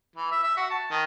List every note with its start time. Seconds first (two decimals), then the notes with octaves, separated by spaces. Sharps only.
0.16 E3
0.32 E5
0.44 E5
0.57 F#4
0.71 A5
0.91 D#3